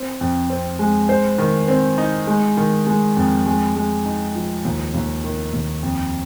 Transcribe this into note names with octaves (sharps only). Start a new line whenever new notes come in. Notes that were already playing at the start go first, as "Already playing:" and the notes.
Already playing: C4
F2
C4
G#3
C5
D#3
C4
D#4
G#3
D#3
G#3
F2
G#3
G#3
D#4
F3
D#2
D#2
D#3
D#2
F2